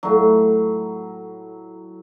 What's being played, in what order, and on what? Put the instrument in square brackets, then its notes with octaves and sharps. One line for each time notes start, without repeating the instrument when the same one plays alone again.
[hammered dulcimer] A2 F#3